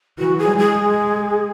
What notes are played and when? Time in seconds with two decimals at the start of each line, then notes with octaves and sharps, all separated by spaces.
0.19 E3 F#4
0.39 G#4
0.48 G#3
0.58 G#4
0.79 G#3